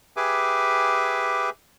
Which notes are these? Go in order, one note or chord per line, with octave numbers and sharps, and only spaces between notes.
G4 G#4 B4 E5 G#5 D6